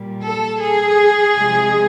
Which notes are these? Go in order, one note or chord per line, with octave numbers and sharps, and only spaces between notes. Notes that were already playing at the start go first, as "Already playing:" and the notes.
Already playing: A#2 G3
A4
G#4
C3 F3 G#3